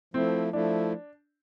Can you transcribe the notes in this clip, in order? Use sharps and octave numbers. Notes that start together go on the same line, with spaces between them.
F3 A3 C4 E4
F3 A3 D4 E4